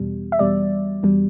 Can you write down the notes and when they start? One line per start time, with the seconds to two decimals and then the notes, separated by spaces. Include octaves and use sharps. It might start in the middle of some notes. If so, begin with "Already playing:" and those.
Already playing: E2 B2 G3
0.32 E5
0.39 E2 B2 G3 D5
1.03 E2 B2 G3